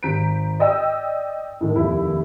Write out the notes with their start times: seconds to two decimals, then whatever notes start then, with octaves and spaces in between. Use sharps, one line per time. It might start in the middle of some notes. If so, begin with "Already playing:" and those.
0.03 G#1 A#5 G6 B6 D7
0.59 D5 D#5 G5 E6
1.61 A2 D#3
1.75 F1 D#2 E4 B5